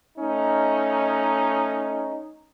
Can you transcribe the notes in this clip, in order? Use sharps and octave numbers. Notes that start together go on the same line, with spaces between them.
A3 C#4 D#4